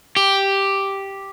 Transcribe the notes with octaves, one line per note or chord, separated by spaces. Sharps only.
G4